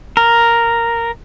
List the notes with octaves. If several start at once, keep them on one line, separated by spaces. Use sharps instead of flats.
A#4